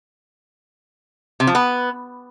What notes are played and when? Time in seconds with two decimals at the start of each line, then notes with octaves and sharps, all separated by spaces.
1.40 C3
1.47 F3
1.55 B3